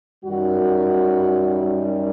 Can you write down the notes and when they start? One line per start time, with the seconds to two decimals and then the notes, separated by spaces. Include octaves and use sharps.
0.23 F#2 D#3 G3 F#4